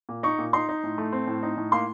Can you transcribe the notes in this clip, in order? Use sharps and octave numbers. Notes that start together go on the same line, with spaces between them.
A#2
D#4 C#6
A#2
D#4 C6
D#4
A2
A3
C4
A2
D#4
A2
A#3 C6